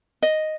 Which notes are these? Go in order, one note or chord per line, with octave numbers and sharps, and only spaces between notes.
D#5